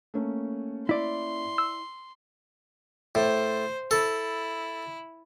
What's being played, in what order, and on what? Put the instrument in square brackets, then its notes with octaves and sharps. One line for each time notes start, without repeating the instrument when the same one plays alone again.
[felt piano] A3 A#3 C#4
[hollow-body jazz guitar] E4 D5 [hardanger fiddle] C6
[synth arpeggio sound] E6
[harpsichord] A2 [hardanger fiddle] C5
[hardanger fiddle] E4 [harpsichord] A4